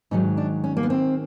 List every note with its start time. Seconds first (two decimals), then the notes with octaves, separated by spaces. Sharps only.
0.11 G#2 D#3 F#3 D#4
0.37 D4
0.64 C#4
0.77 A#3
0.83 B3
0.90 C4